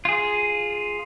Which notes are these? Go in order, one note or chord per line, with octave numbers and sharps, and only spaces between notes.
F4 G#4